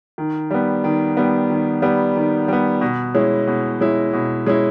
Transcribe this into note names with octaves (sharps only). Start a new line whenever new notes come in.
D#3
G3 B3
D#3
G3 B3
D#3
G3 B3
D#3
G3 B3
B2
G#3 C#4 E4
B2
G#3 C#4 E4
B2
G#3 C#4 E4